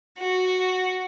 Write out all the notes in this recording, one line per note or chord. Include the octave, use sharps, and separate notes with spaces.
F#4